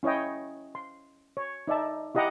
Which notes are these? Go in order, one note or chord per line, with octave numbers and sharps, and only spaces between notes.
C#4 E4 C#5 D#5 G5
C6
C#5
D#4 D5 E5 A5
E4 G4 D#5 F#5 A#5 D6